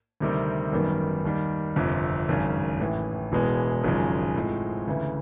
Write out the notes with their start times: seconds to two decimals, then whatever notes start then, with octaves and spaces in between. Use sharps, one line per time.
0.20 D2 C3 D#3 G3 C4
0.72 G#1 F#2 D#3 G3 B3
1.25 D#2 D#3 G3
1.76 G1 F2 C3
2.28 G#1 F#2 C#3
2.80 A1 A2 E3
3.32 E1 E2 B2 G#3 B3
3.84 G#1 F#2 C#3 F3 G#3
4.36 A2 F3 G#3 C4
4.87 D2 C#3 E3